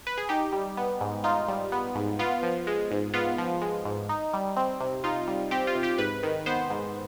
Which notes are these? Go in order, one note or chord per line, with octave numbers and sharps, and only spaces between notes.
B4
G#4
D#4 G4
G3
B3
G#2
D#4 F4
G3
B3
G#2
B3 F4
F3
G#3
G#2
B3 F4
F3
G#3
G#2
D#4
G3
C4
C3
D#4 F4
G3
C4 G4
F4
C3
G4
G#2 B4
D#3
B3 C5
G#2